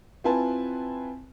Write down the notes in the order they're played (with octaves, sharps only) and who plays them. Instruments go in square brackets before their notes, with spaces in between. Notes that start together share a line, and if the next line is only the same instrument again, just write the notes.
[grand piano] C4 E4 F4 B4 G#5 A5